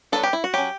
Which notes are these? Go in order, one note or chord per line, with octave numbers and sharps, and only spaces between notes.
F#3 B3 D4 A4
G4
E4
F#4
F#3 C#4 G4